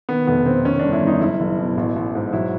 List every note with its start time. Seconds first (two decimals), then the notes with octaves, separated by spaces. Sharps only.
0.09 D#3 B3
0.27 F1 B3
0.46 F1 C4
0.64 D#3 C#4
0.79 G1 D4
0.93 E4
1.02 G1 D#4
1.21 F#1 E4
1.40 F#1
1.58 B2
1.77 A1
1.96 A1
2.15 G#2
2.33 F#3 E4